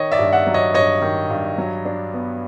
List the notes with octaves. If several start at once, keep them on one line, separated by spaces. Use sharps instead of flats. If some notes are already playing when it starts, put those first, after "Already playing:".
Already playing: D#3 C#5 D#5
D5 E5
G2
E5 F#5
F#3
C#5 D#5
G2 C#5 D#5
D#3
G2
F#3
D4
B3